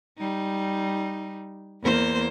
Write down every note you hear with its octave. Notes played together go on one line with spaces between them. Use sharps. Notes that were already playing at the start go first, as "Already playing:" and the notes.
G3 D#4
E2 A#3 C5